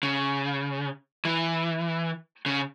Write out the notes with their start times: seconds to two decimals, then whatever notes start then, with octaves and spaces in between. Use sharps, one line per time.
0.03 C#3
1.25 E3
2.46 C#3